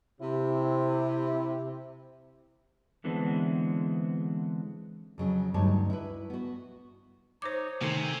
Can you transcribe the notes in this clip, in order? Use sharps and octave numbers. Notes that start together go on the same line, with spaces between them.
C3 E4
D3 E3 G#3 B3 C4 D4
F2 C#3 F#3
D2 G2 F#3 D#4 C#5 A5
E4 B4
B3 F#4
D#4 C5 C#5 D6
A2 C3 D#3 A3 G#5